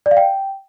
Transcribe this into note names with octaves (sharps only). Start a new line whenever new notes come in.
D5
F5
G5